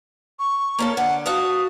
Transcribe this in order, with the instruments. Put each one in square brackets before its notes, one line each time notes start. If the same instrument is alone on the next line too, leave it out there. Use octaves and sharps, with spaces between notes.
[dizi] C#6
[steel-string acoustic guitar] A#3 C#4 A4
[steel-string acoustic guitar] D3 [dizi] F#5
[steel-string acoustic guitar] F#4 A4 F5 [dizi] D#6